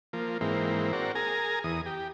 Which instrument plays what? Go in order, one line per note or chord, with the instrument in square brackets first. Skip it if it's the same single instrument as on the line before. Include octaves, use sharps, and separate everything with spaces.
[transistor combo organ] F3 A#3
G#2 E3 A#3 C4
C4 F#4 A#4 D5
G#4 A#4 G#5 A#5
E2 D#6
G4